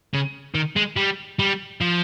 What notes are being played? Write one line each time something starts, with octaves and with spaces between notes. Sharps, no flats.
C#3
D#3
G#3
G3
G3
F3